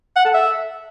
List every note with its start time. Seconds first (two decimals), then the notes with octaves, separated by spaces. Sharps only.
0.16 F#5
0.25 A4
0.34 E5